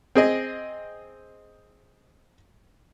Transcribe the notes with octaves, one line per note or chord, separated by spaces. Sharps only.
C4 G#4 D#5